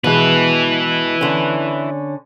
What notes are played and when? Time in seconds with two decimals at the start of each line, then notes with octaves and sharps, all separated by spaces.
0.04 B2 G#3 E4 B4
1.21 D3 C#4